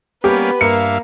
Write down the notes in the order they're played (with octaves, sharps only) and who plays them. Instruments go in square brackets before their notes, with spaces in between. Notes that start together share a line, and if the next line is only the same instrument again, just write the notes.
[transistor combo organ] G3 A#3 C#4 [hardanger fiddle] B3 B4 [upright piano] G4
[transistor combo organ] G2 E5 F5 [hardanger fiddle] A#3 [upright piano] C#7